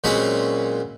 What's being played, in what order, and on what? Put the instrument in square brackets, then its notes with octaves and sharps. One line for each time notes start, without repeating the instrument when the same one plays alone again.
[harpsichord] A#2 F#3 G#3 C4 C#4 B5